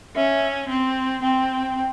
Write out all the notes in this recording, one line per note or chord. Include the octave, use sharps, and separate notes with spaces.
C#4 E5
C4
C4 G5